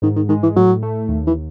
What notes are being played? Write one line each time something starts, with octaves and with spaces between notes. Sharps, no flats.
G#2 D#3
D#3
D#3 G#3
E3
A2 F#3
A3
D#2
E3